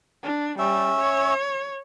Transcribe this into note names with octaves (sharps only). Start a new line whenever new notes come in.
D4
G3 C#4 E5
C#5